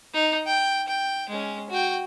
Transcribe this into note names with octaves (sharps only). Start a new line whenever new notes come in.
D#4
G5
G5
G#3 C#4
F#4 G5